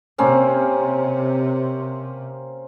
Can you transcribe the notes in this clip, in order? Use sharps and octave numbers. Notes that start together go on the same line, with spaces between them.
C3 A#3 C4 C#4